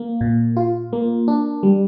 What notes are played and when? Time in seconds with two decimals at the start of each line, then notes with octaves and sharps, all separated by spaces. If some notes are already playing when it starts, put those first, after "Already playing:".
Already playing: A#3
0.21 A#2
0.57 F4
0.93 A#3
1.28 D4
1.63 G3